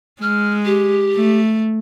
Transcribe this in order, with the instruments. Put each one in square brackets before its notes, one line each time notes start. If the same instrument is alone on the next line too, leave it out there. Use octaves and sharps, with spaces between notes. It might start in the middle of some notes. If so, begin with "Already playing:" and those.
[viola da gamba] G#3 [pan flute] F6
[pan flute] G4
[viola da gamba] A3